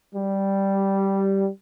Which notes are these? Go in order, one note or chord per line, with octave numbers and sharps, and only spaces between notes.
G3